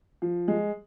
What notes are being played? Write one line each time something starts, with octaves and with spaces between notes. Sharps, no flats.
F3
G#3